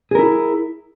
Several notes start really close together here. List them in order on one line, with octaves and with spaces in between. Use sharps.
G#4 A#4 E4